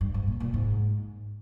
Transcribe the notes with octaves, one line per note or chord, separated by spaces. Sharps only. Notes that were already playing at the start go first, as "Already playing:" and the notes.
G2
G#2
A#2
A#2
G#2